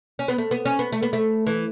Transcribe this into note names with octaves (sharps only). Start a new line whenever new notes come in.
C#4
B3
A3
B3
C#4
B3
A3
B3
A3
E3